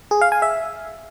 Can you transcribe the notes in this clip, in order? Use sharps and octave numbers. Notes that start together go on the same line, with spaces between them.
G#4
F5
G#5
E5